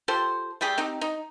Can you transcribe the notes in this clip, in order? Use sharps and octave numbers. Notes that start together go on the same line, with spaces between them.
F4 G4 A4 C5
G3 A3 G4 G#4
C4 D#4 G4
D#4